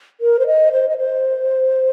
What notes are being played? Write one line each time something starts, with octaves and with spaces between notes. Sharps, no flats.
A#4
C5
D#5
C5
D#5
C5